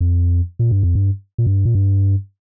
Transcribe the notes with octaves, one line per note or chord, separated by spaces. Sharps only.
F2
A#2
G2
F2
G2
A#2
G2
A#2
G2